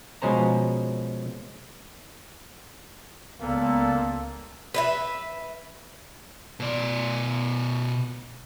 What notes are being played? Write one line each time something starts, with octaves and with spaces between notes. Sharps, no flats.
B2 F3 G#3 C#4 C5 A#5
C#2 A#2 A#3 B3 A4
B4 D#5 E5
B2 D5